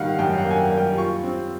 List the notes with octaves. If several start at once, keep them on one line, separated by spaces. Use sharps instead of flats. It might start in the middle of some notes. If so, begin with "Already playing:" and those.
Already playing: D#3 G3 A#3 F5 F#5
F#2 G5
F#5
A#3
G#5
G5
G3
G5
F4 C#6
C4